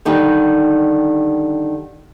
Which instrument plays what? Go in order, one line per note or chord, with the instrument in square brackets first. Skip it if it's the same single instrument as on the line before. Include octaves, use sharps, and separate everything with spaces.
[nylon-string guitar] D3 D#3 G3 D#4 G4